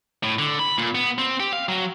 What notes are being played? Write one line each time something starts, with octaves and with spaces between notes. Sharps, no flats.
A2
D3
B5
A#2
B3
C4
G4
F5
F#3